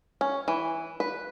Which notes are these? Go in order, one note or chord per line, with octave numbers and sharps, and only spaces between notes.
C#4
E3
B4